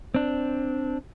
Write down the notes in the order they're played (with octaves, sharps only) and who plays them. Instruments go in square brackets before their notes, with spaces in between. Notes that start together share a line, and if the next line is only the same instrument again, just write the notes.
[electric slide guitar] C4 D4